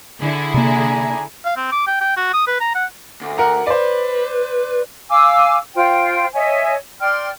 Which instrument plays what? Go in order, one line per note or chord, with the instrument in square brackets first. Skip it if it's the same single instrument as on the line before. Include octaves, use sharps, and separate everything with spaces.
[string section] D3 E4 G#4
[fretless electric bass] C3 A#3 [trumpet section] D4 G#5 A#5
[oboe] F5
C4
D6
G5
G5
F#4
D#6
B4
A#5
F#5
[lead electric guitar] D2
[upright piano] A#4 F#5 A#5
[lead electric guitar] B4 [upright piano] C5 D5
[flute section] F5 G#5 D6 E6
F4 C5 G5
C#5 D#5 E5 G#5
D5 G5 C6 F6